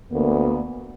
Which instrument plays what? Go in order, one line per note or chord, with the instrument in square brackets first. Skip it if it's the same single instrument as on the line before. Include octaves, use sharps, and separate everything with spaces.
[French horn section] D2 A#3 B3